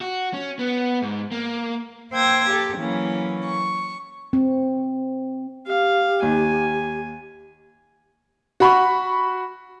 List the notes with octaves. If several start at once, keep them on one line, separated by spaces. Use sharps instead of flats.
F#4
C#4
B3
G#2
A#3
A#3 C5 G5 E6 G#6 A#6
G4 A4
E3 F#3 A#3 C#4
C#6
C4
G4 F5
D#2 G#5
F#4 B5 C#6